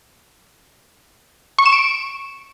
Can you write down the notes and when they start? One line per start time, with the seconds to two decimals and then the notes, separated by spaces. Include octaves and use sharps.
1.59 C#6
1.66 E7
1.73 D7